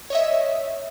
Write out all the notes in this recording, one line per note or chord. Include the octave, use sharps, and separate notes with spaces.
C#5 D#5 E5